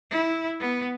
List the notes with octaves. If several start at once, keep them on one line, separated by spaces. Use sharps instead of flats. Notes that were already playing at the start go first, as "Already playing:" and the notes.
E4
B3